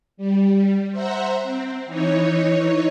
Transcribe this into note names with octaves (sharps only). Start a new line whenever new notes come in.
G3
C5 E5 F#5 A#5
C4
E3 D#4 C#5